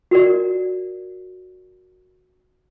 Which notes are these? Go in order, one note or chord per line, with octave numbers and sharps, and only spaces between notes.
F#4 A#4 D5